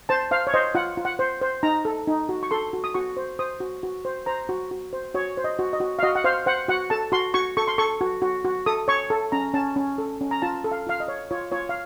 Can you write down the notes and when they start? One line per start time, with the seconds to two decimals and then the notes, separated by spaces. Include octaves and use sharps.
0.09 C5 A5
0.31 C5 F5
0.47 C#5
0.54 C5 D#5
0.75 F4 F#5
0.97 F4
1.05 F#5
1.19 C5
1.42 C5
1.63 D#4 A#5
1.85 A4
2.07 D#4
2.29 F#4
2.43 C#6
2.51 A4 C6
2.73 F#4
2.84 D#6
2.94 F#4 C#6
3.17 C5
3.39 C5 D#6
3.60 F#4
3.83 F#4
4.05 C5
4.26 C5 A#5
4.49 F#4
4.71 F#4
4.93 C5
5.15 F#4 C#5
5.37 C5
5.44 D#5
5.59 F#4
5.73 D#5
5.80 F#4
5.99 F5
6.03 F#4 D#5
6.15 F#5
6.24 C5 F5
6.46 C5 F#5
6.68 F#4 F#5
6.90 A4 A5
7.12 F#4 C6
7.34 F#4 C#6
7.57 A4 C#6
7.68 C6
7.78 A4 C#6
8.01 F#4
8.22 F#4
8.45 F#4
8.66 A4 D#6
8.88 C#5 C#6
9.10 A4
9.32 C#4 A#5
9.54 C#4 A5
9.76 C#4
9.98 A4
10.21 C#4
10.31 A#5
10.42 F4 A5
10.64 A4
10.72 F5
10.87 F4 F5
11.00 D#5
11.08 C#5
11.31 F4 C#5
11.52 F4 C#5
11.69 F5